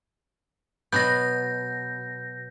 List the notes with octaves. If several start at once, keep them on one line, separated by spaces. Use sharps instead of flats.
B2 F#3 B3 G6 A#6